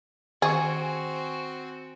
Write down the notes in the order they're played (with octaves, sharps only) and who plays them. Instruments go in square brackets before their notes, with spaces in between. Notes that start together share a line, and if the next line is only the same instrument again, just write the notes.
[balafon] D#3 [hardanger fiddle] C4 F#4 [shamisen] G#4 [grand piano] G#5 C#6